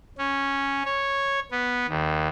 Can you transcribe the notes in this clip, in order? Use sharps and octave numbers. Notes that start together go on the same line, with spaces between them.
C#4
C#5
B3
D#2